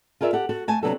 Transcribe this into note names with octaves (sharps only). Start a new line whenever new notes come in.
F4 G#4 A#4 D5 E5
G4 A4 F#5
F#4 A4
A3 G#5 A5
C3 F#3 B3 D4 F#4 A4